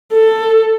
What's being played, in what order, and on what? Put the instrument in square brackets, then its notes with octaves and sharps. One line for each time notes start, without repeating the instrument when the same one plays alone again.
[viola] A4